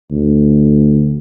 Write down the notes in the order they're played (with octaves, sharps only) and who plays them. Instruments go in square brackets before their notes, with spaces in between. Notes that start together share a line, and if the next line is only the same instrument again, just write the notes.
[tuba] D2